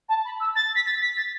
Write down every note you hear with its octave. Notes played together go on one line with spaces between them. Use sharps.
A5
B5
E6
A6
B6
A6
B6
A6